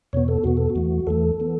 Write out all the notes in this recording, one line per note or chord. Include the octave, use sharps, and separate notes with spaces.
E2 B2 B3 C#5
A4
E2 B2 B3 F#4
A4
F#4
E2 E3 A3
E2 E3 A3 A4
E3 B3